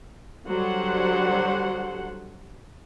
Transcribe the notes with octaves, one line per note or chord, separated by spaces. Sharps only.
D3 F#3 G3 C5 F#5